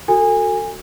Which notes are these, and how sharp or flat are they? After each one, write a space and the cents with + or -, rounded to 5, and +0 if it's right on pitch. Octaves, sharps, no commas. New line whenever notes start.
F#4 +0 A4 +25 G#5 -25